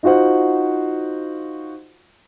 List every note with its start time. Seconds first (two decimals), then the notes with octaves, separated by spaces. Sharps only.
0.03 D#4 F4 F#4 C5 F#5